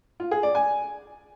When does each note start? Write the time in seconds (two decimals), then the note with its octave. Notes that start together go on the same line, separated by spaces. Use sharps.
0.20 F4
0.31 G#4
0.43 D5
0.55 G#5